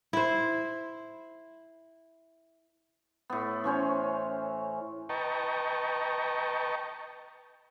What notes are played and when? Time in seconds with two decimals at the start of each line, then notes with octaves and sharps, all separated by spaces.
0.13 E4 C5
3.30 A2 B3
3.64 E3 C#4 C5 C#5
5.09 B4 D#5 G5 A5 A#5 C#6